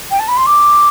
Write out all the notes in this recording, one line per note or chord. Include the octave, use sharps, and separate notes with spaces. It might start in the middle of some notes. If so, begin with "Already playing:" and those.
G5
A5
B5
C6
D6